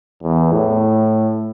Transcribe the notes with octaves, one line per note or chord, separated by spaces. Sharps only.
E2
A2